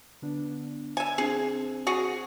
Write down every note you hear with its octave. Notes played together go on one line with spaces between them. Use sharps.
D3 B3 D4
E5 G#5
C4 D4 G#4 C5
F#4 G#4